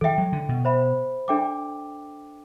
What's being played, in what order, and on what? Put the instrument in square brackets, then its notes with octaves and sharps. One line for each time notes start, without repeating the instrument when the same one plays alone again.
[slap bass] E3 [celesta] A4
[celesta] E5 G5
[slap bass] F#3
D3
B2
[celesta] C5 E5 B5
D4 A4 E5 G5 D6